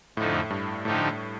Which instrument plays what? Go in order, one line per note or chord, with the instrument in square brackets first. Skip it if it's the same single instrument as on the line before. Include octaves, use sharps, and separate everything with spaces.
[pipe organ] F2 D3 F3 A3 D#4 [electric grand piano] A2
[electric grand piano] G2
[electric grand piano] A2 [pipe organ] D3 F3 A3 D#4 G4